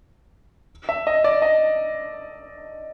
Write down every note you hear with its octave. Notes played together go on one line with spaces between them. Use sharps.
E5
D#5
D5
D#5